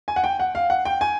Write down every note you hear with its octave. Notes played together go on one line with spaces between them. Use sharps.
G#5
F#5
G5
F#5
F5
F#5
G5
G#5